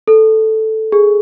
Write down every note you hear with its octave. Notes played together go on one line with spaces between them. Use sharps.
A4
G#4